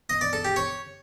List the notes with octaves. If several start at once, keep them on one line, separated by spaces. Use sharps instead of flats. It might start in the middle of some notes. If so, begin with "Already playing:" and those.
D#5
D5
A4
G4
C#5